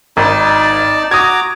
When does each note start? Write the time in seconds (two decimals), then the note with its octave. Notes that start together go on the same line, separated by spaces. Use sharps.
0.17 G#1 D#4 D5 A5
1.11 F#4 A#5 D6 D#6 G#6